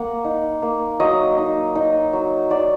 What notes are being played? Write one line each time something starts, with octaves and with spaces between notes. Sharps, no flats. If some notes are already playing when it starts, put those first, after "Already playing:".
Already playing: A#3 F#5
D#4
A#3
F#3 D#5
D#4
D#4
F#3
F#3 D5